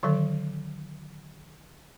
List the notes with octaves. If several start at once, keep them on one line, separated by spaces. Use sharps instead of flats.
D3 D#3 F#3 A4